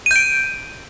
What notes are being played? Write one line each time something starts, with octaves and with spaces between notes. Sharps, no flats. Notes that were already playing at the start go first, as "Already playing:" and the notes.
G6 D7 D#7